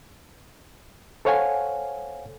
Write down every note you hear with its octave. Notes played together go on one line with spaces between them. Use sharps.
A4 C5 C#5 F5 F#5 G#5